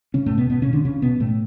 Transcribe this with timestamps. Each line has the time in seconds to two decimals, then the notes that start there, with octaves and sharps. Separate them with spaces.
0.14 C#3 C#4
0.26 A2 A3
0.38 B2 B3
0.50 B2 B3
0.62 C#3 C#4
0.73 D3 D4
0.85 C#3 C#4
1.02 B2 B3
1.20 A2 A3